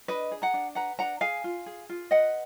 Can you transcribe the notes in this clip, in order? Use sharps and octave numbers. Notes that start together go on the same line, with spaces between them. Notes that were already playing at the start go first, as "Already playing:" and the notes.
D4 B4 D#5
G#4
F#5 A#5
D4
B4 F#5 A#5
D4 F#5 A#5
G#4 F5 G#5
F4
G#4
F4
B4 D#5 F#5